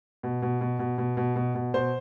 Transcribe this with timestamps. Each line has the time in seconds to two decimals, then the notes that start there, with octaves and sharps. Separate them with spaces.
0.23 B2
0.42 B2
0.61 B2
0.79 B2
0.98 B2
1.17 B2
1.36 B2
1.55 B2
1.74 B2 C5